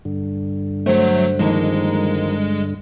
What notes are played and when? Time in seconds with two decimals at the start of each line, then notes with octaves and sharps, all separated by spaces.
0.05 G2 D3
0.86 F#3 A3 C5 F#5
1.39 D#3 F3 G#3 A#3